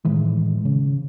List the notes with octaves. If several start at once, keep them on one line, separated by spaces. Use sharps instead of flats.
A2 D#3 E3 G#3
C#3